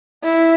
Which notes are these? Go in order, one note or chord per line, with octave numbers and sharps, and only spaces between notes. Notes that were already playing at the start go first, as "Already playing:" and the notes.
E4